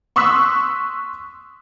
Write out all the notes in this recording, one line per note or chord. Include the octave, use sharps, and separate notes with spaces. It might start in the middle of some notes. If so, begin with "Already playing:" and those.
C6 C#6 D#6 E6 F#6 B6